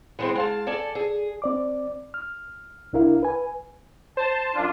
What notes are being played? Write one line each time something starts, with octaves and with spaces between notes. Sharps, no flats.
E3 G#3 A3 B3 C4
G#3 F5 A5
A4 D5 G#5 A5
G#4
C4 D5 D6
F6
C2 D4 E4 A#4 F5
B4 G#5
C5 A5
F#2 D4 F4